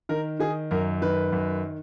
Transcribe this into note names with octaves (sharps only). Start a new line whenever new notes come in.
D#3 A#4
D#3 G#4
F#2 A#4
D#3 B4
F#2